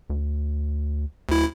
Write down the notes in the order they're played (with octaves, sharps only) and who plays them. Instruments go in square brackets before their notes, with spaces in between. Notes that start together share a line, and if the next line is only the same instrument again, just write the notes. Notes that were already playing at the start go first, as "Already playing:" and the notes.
[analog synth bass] D2
[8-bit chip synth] D2 E4